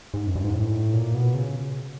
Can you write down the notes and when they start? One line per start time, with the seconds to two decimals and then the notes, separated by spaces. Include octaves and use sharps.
0.14 G#2
0.27 F#2
0.36 G2
0.44 G#2
0.53 A2
0.93 A#2
1.14 B2
1.34 C#3